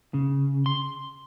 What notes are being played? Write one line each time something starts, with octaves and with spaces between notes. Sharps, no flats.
C#3
C6